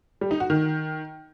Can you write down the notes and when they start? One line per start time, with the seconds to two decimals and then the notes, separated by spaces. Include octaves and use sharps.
0.21 G3
0.31 D#4
0.40 F#4
0.50 D#3